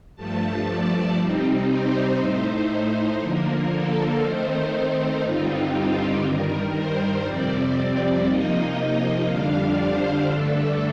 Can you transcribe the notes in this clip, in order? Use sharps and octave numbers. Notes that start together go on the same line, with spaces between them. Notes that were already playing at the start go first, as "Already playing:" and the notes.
G2 F3 A3 A5
D5
C3 G3 C4 D#4
C5
A2 A3 D#4 C5
D3 F3 A#3 A#4
A4
D#3 A3 C4 D#4 C5
G2 D3 G3 C4 D#4 F4
G4
G2 D#3 G3 A#4
C5
F2 C3 G3 C4 D5
C3 F3 A#3 D#4 D#5
F2 D3 G3 D4 F5
C5
G2 D3 A3 D4 A4